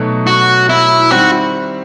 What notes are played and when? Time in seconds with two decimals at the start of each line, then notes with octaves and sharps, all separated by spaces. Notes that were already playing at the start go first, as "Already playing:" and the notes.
Already playing: B2 F#3 A3 D#4
0.27 F#4
0.69 E4
1.11 D#3 G3 C4 E4 F#4